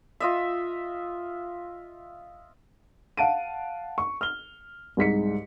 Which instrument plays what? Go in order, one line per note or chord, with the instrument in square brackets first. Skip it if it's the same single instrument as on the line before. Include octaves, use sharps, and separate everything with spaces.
[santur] F4 D#5 E5
[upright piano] F5 F#5 A5 D7 D#7
C#6
F6 G7
C2 G#2 B6 C#7